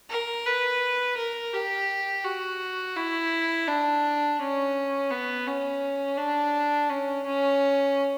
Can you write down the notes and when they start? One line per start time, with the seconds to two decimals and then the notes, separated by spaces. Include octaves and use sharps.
0.10 A#4
0.46 B4
1.17 A#4
1.53 G4
2.24 F#4
2.96 E4
3.67 D4
4.39 C#4
5.10 B3
5.47 C#4
6.18 D4
6.89 C#4
7.26 C#4